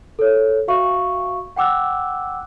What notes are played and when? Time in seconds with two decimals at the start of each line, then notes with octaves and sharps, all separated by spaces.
0.19 A4 C#5
0.68 F#4 E5 F5 C#6
1.56 F#5 G5 D6 E6 F#6